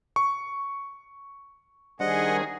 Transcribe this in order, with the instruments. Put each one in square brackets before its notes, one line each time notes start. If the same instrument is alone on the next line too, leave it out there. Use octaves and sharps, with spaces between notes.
[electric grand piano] C#6
[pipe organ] D#3 G#4 [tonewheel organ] G3 D4 C5 [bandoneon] D#5 F#5